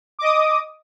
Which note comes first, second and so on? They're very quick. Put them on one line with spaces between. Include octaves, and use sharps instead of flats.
D6 D#5 D#6